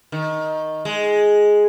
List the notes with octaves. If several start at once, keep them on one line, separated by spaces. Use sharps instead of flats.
D#3
G#3